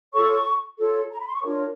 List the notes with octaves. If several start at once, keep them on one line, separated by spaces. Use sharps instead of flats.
F4 A4 C#5 C#6
F4 A4 C#5
A#5
B5
C6
C#6
D4 F4 A#4 C#5 D6